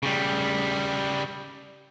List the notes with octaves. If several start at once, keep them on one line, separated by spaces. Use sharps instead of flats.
C#3 G3